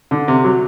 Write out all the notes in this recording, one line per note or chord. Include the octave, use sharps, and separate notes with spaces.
D3
C3
F#3